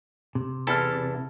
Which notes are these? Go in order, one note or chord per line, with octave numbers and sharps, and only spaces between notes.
C3
E2 E4 A4 A5 F6